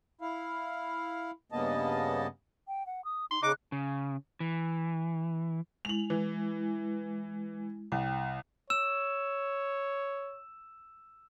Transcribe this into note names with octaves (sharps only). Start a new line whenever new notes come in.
E4 F5
G2 C#3 A#3 B3 D#5 A5
G5
F#5
D#6
D#4 C6
C#3 D#4 D6 F#6
C#3
E3
G#3 E4 F7 F#7
E3
C2 G5
C#5 E6 E7